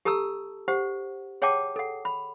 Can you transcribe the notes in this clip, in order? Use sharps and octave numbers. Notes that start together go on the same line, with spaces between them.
G4 A4 A5 A#5 E6
G4 C5 F#5
G#4 C#5 F#5 G5 A5 D6
A4 F#5
B5